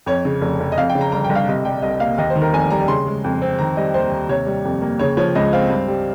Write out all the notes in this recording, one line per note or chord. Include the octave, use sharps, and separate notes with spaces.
F2 C#5
C#3
F1
F1
D#5
F2 F5
G5
C#3
A#5
G1 A#5
G5
G1
F5
C3 D#5
G3 G5
C2 D#5
A#3 F5
D#2 D#5
C5
D#3
A#4
F1 G#5
G3 A#5
C#3 C6
G#3
F2
C4
D#3 A#5
G3 D#5
D#2 C5
D#2
C3 C#5
G3
F2
A#3
C#3 C#5
F3 C#5
C#2 D#5
C4 F5
G2
G3